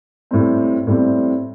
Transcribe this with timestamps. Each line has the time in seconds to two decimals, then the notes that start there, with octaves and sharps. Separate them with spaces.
0.31 A2 G3 C4
0.87 A2 G3 C4